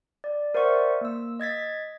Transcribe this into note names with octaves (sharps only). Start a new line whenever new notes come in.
D5
A#4 C5 D5 E5 F#5 C#6
A#3 E6
D#5 G#6 A6 B6